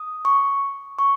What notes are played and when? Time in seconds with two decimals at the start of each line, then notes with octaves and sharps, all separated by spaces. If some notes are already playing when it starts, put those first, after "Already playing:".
Already playing: D#6
0.25 C#6
0.99 C#6